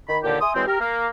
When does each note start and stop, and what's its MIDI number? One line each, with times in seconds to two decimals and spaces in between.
0.08 0.18 51
0.08 0.18 83
0.22 0.40 39
0.22 0.40 46
0.22 0.40 50
0.22 0.40 67
0.40 0.52 76
0.40 0.52 80
0.40 0.52 84
0.40 0.52 87
0.54 0.62 52
0.54 0.62 54
0.54 0.62 56
0.54 0.62 60
0.67 0.79 67
0.67 0.79 70
0.80 1.07 58